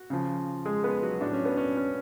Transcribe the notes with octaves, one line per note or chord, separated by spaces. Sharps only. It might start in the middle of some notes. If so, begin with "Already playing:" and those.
Already playing: F#4
C#3 F3
G#3 G#4
B3 B4
F#3 F#4
A2 F#3 D4
C#4
B3
C#4
C#4